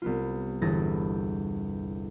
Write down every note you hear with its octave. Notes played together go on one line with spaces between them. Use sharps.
C2 B3 F4
G1 E2 E3 G#4 A6 A#6